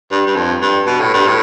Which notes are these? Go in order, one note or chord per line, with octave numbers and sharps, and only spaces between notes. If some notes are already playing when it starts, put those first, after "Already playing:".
G2
G2
F2
G2
B2
A2
G2
A2